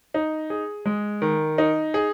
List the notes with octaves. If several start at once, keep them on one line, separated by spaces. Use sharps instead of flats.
D#4
G#4
G#3
D#3
D#4
G#4